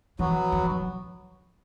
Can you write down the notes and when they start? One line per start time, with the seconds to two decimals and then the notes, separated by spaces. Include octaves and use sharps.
0.19 E3 F#3 B3 F#4
0.52 E3
0.70 F#3